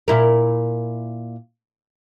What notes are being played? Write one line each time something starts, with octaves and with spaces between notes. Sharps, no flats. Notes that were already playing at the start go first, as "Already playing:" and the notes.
A#2 E4 A#4